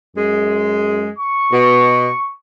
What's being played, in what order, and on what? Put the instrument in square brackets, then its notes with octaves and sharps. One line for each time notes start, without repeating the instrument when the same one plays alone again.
[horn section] F#2 G#3
[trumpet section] C#6
[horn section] B2